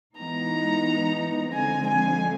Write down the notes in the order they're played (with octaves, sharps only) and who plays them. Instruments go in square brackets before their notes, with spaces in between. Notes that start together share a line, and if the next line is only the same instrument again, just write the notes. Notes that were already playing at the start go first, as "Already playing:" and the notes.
[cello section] E3 G#3 B3 D#4 [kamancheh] A#5
[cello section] D3 F3 G#3 C4 [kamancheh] G#5
[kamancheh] G#5